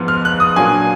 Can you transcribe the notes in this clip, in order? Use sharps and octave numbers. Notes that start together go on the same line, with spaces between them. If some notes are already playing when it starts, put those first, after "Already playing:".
Already playing: G#2 F3 B3
F6
F#6
D#6
A#2 F#3 A#3 D4 G#5